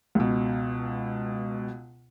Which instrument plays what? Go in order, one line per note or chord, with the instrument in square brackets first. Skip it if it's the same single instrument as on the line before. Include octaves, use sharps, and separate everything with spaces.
[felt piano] C#2 B2